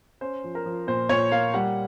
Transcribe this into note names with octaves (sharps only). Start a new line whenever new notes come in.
C#4 C5
F3
A#4
F3
A#2 C5
A#2 C#5
A#3 F5
G3 F#5